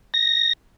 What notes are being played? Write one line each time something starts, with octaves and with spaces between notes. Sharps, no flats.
A#6